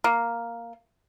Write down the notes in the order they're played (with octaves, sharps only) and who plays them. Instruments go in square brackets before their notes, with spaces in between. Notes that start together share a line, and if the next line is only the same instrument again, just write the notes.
[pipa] A#3